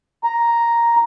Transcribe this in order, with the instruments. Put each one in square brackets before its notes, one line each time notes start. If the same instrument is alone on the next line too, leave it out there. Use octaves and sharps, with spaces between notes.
[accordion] A#5